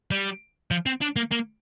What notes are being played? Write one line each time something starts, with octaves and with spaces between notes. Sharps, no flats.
G3
F3
C4
D4
A#3
A#3